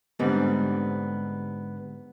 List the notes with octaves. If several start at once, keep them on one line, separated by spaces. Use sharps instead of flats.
G#2 D3 G3 B3 C4